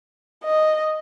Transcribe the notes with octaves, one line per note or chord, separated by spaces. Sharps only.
D#5